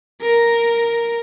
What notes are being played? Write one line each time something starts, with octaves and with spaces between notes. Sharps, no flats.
A#4